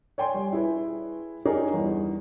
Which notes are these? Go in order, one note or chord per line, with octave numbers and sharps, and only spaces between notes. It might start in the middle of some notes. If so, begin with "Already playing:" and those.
C#5 D5 G5 G#5 C6
G3
E4 G#4 B4
D#4 G4 G#4 A#4 C#5 D5
E2 G2